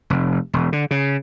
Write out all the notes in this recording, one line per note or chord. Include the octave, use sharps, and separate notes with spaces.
F1
E1
D3
C#3